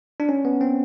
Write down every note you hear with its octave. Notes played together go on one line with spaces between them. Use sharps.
D4
C#4
B3
C4